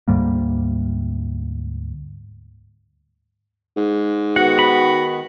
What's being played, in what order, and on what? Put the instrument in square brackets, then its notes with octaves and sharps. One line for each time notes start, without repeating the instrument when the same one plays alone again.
[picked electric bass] D2 G#2 G3 A#3
[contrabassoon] G#2
[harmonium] D#3 B3 [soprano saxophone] F#4 [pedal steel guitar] F#5
[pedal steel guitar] B5